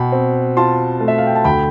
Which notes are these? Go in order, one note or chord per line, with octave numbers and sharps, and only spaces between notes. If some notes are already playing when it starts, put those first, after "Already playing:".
Already playing: B2 G5 B5
C4
F4 A5 C6
A3
E5
F5
G5
A5
D2 G5 B5